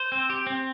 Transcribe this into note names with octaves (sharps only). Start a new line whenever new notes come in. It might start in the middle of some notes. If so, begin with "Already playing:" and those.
Already playing: C5
C4
G4
C4